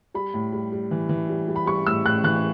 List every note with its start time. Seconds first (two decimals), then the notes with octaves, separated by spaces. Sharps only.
0.14 G3 B5
0.34 A2
0.53 G3
0.72 G3
0.91 E3
1.09 E3
1.29 G3
1.48 G3
1.56 B5
1.66 G3 C#6
1.87 A2 E6
2.06 A2 F#6
2.24 E3 F#6